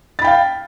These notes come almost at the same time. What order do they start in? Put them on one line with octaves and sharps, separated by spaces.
A6 B5 G5 F5